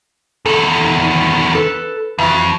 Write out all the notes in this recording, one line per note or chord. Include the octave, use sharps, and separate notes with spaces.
E2 D#3 A4
A4 B4
F2 E3 F#4